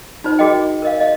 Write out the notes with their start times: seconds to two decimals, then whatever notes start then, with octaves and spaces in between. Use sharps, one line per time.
0.24 D#4 F4 C5
0.39 F#4 G#4 A#4 D#5 G5
0.82 A#4 D#5 F5
1.00 D#5 F5